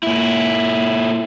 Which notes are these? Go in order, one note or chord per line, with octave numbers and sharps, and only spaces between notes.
A#2 E4